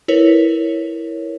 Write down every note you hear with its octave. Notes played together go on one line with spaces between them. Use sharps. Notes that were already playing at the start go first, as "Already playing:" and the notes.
E4 A#4 B4 C#5